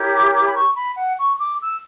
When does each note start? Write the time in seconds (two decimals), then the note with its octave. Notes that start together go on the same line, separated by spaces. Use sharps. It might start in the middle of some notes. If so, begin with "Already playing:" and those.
Already playing: E4 G4 A#4 C#5
0.13 D6
0.34 D6
0.44 B5
0.54 C#6
0.75 B5
0.96 F#5
1.18 C#6
1.38 D6
1.60 E6